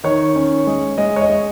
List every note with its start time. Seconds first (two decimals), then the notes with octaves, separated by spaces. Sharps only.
0.04 D#3 C#5
0.36 C#4
0.67 G#3
0.98 G#3 D#5
1.16 C#5
1.21 D#5
1.29 G#3